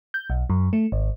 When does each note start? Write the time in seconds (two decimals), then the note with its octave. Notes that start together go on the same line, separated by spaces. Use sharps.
0.14 G6
0.30 B1
0.50 F#2
0.73 A3
0.92 G#1